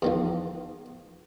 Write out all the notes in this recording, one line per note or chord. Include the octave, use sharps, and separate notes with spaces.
E2 D#3 F3